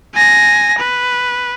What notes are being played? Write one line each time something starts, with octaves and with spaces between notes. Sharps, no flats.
G#5 A#6
B4